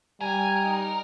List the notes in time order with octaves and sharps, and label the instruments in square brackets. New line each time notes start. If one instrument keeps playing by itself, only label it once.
[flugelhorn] G3 [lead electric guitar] A#4 [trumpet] G#5
[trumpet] D#4